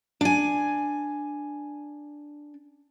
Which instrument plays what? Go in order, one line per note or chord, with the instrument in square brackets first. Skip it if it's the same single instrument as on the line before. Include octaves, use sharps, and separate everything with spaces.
[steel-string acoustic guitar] D4 G#5